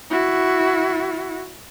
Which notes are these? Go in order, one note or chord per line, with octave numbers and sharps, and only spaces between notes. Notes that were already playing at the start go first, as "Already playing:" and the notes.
E4 F#4